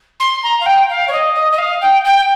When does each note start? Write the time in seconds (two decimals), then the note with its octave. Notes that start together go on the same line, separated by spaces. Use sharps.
0.19 C6
0.43 A#5
0.60 F5
0.66 G5
0.89 F5
1.08 C#5
1.12 D#5
1.34 D#5
1.51 D#5
1.58 F5
1.81 G5
2.04 G5